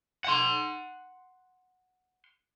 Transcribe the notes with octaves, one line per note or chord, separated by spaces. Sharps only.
F#5 C6